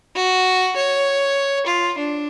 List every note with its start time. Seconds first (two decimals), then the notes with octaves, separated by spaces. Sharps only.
0.15 F#4
0.76 C#5
1.67 F4
1.98 D4